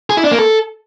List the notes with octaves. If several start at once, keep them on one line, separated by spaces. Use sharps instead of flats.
G#4
E4
D4
A#3
A4